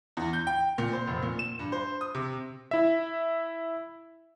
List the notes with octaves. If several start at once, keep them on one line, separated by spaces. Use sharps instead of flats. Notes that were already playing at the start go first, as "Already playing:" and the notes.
E2
G6
G5
A#2
C5
F1
A#2
E7
G2
C5
D#6
C3
E4 E5